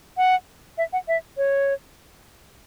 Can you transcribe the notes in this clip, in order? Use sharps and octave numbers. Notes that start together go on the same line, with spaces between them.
F#5
E5
F#5
E5
C#5